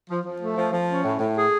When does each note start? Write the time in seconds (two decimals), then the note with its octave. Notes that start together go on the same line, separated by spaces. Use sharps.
0.09 F3
0.24 F3
0.41 A3
0.56 F3
0.72 F3
0.88 C#4
1.04 A2
1.19 A2
1.36 G#4